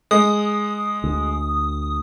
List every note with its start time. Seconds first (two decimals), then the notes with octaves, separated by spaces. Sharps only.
0.11 G#3 D#6
1.04 D2